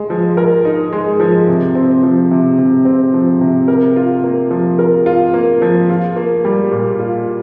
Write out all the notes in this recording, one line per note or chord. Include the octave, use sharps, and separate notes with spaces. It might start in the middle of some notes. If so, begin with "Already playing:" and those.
Already playing: G#3
F3
A#4
D#4
G#3
F3
C3
C4
F3
C3
C3
C4
F3
C3
A#4
F4
A#3
F3
A#4
F4
A#3
F3
F4
A#3
G3
A#2
F4